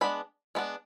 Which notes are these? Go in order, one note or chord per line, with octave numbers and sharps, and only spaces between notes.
G#3 B3 D4 B5
G#3 B3 D4 B5